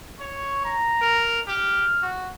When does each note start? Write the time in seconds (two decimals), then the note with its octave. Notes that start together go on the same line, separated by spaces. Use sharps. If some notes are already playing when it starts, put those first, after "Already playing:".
0.21 C#5 C#6
0.65 A#5
1.02 A#4
1.48 G4 F6
2.02 F#4